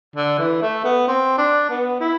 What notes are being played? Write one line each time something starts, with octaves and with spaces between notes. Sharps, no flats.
D3
E3
A3
B3
C4
D4
B3
E4